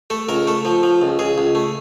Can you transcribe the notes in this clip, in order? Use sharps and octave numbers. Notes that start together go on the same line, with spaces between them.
A3 A4
C#2 A#4
A3 A4
F3
F3
C#2
C#2 G#4
C#2
A3